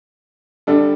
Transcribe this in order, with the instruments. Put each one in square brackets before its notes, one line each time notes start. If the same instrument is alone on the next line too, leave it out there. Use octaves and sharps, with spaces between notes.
[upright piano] D3 G3 D4 A4